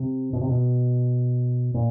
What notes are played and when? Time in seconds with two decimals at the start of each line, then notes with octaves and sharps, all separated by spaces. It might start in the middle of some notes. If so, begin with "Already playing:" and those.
Already playing: C3
0.33 B2
0.41 C3
0.49 B2
1.74 A#2